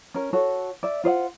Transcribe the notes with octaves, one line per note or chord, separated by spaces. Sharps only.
C#4 A#4
F#4 A4 C#5
D5 E5
F4 C5 D#5 F#5